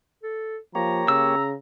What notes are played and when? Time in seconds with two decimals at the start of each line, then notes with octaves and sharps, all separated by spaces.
0.23 A4
0.75 F3 A#3 G4 C#5 A#5
1.08 C#3 E6